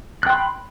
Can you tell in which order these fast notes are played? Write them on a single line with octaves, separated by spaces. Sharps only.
F#6 G5 C6 B5